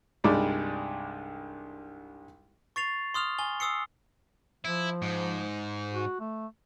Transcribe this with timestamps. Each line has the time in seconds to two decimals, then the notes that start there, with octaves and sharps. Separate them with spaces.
0.24 C2 G2 G3 G#3 D#4 D5
2.76 C#6 A6 C7 F7
3.14 C6 D#6 F6 F7
3.38 G#5 G7
3.60 D#6 E6 C7 C#7
4.65 F3 E4
5.02 G#2
5.94 F#4
6.20 A3